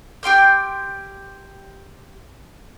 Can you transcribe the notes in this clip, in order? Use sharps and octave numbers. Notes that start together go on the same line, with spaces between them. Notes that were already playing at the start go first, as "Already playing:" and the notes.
G4 G5 C6 F6